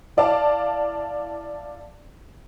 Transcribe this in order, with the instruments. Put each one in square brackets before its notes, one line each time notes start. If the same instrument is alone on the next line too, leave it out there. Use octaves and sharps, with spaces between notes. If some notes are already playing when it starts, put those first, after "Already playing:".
[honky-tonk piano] E4 D5 F5 A5 D6